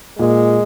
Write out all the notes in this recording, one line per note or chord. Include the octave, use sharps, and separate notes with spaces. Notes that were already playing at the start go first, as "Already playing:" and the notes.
A#2 G#3